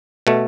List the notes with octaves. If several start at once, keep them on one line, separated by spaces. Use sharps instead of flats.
B2 A3